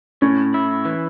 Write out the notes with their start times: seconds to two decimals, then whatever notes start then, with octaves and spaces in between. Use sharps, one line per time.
0.22 A2 C#4
0.54 E4
0.85 E3